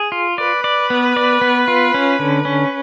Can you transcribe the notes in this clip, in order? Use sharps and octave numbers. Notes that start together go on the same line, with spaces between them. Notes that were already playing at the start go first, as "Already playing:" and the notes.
Already playing: G#4
F4
B4 D5
D5
B3
D5
B3
F4
C#4
D3
C#4